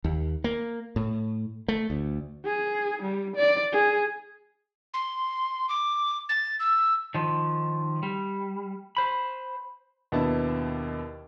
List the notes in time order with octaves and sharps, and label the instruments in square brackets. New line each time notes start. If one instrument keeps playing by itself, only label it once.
[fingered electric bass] D#2
A#3
A2
A3
D2
[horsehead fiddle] G#4
G3
D5
G#4
[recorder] C6
D6
A6
E6
[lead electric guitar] D#3 F3
G3
C5 B5
[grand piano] D#2 B2 B3 D4 E4 A5